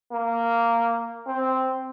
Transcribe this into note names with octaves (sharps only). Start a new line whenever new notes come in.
A#3
C4